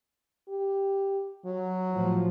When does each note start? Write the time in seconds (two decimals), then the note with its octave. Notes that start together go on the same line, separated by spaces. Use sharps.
0.49 G4
1.46 F#3
1.93 A2 F3